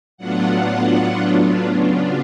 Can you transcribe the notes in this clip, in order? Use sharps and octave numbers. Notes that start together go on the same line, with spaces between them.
A2 F#3 B3 D4 F4 F#5
C#3 F#3 B3 D4 F4